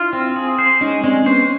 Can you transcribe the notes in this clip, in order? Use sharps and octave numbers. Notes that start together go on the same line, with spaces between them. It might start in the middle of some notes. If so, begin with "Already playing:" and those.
Already playing: D4 E4 F4
C4
G#4
C5
G#3 C#4 D#4
G#3 C4 D4
B3 C#4 C5